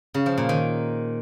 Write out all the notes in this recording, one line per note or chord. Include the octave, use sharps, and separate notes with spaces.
C#3
F3
A#2
D#3